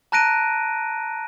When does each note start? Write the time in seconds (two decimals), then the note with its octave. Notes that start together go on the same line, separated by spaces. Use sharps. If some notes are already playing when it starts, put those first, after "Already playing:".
0.12 A5 A#5 F#6 A#6 D7 D#7